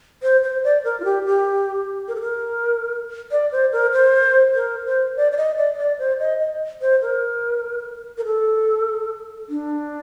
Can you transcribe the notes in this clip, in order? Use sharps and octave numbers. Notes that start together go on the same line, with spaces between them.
C5
C5
D5
A#4
F4
G4
G4
A#4
A4
A#4
D5
C5
A#4
C5
A#4
C5
D5
D5
D#5
D5
D#5
D5
C5
D#5
D#5
C5
A#4
A#4
A4
D4